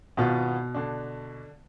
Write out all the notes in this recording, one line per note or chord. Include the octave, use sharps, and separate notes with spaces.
G#1 B2 B3 F4
D3 D4